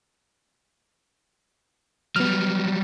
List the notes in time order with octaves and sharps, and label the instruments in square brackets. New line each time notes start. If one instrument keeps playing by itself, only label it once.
[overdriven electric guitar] F#3 G3 [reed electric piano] B3 F6